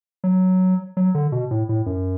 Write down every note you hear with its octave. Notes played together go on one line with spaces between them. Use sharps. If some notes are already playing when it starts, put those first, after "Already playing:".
F#3
F#3
D3
B2
A2
A2
F#2